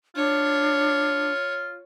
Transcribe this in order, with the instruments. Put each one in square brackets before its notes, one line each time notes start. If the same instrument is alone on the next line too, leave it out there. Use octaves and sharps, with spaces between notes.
[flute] D4 [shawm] F4 [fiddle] C#5